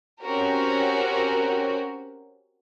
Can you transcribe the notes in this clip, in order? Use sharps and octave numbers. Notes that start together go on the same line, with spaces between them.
C4 C#4 F#4 G4 A#4